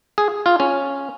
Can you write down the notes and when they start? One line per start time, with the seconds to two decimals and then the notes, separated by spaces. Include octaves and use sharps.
0.18 G#4
0.46 F4
0.60 C#4